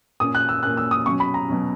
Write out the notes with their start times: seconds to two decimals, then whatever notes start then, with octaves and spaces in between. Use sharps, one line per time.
0.20 A#2 A#3 C#4 D#6
0.35 F#6
0.49 E6
0.63 A#2 A#3 C#4 F#6
0.77 E6
0.91 D#6
1.06 B2 F#3 C#4 C#6
1.20 B5
1.34 A#5
1.48 B2 F#3 C#4